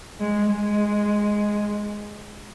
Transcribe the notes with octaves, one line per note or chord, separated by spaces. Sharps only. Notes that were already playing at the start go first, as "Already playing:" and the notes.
G#3
G#3